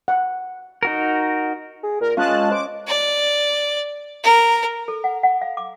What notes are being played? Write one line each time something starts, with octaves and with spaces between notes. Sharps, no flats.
F#5
D#4 F#4 A#4
G#4
A#2 A#4
G#3 C#4 F4 D#5 A5 F#6
C5 D6
D5
A#4
A4
F#5
F#5
F5
D6